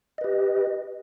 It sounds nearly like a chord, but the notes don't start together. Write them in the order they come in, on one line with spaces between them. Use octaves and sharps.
D#5 B4 G4